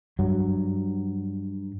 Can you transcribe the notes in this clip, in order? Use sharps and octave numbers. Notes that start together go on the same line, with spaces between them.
G2 F#3